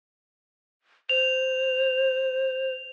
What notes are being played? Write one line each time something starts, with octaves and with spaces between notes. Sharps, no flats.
C5 F7